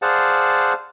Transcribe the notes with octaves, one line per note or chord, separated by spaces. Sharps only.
G#4 C5 D5 F5 F#5 A5